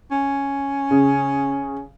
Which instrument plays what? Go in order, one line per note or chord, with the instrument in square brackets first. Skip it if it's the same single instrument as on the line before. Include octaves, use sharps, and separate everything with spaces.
[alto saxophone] C#4
[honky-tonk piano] C#3